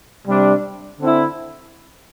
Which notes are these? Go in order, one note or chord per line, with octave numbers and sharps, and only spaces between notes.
C3 G3 D4
D3 C4 E4